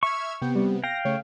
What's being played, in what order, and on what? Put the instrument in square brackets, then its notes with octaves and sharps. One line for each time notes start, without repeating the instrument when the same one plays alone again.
[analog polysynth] E5 F6 G#6 [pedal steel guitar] C#6
[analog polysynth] C3 B3 [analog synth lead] G5
[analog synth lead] G3
[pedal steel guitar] F5 G5 [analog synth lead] A#6
[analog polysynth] C#3 A3 [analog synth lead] C#5